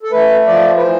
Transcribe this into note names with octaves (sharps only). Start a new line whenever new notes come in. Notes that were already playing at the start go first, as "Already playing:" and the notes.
A4
A3 B4
F3 D5
B4
E3 C5